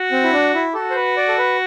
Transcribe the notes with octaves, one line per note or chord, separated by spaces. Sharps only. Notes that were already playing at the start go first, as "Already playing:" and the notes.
Already playing: F#4
C4
E4
D4
E4
F#4 A4
C5
B4
D5
A4
B4